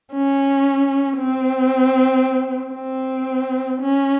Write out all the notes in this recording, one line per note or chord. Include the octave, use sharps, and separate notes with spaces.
C#4
C4
C4
C#4